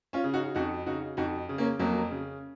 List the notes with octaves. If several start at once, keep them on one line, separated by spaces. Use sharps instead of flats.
C#4 F4
C#3
D#4 F#4
F2 D#4 F#4
C#3 D#4 F#4
F2 D#4 F#4
C#3
A#3 C#4
F2 F#3 A#3
C#3